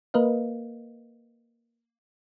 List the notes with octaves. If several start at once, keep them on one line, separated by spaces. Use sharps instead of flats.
A#3 A#4 B4 D#5 F5